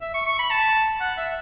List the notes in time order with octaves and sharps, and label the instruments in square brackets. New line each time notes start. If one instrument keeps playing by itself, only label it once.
[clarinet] E5
C#6
C#6
B5
A5
F#5
E5